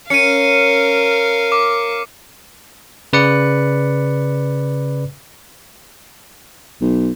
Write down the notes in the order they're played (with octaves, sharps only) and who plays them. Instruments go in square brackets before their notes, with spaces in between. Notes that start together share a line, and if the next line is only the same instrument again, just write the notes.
[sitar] C#4 [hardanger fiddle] A#4 F5 [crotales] C#7 D#7
[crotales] D6
[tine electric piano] C#3 B4 D5 C#7
[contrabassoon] B1